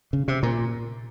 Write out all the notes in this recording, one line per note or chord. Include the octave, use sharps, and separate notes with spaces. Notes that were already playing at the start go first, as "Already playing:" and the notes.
C#3
C3
A#2